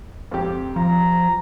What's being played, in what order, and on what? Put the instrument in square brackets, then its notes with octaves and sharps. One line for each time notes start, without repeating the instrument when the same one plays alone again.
[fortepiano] F2 G4
[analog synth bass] F3 [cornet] A#5